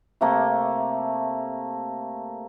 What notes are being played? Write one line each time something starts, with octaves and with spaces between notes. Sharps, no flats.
C3 A3 A#3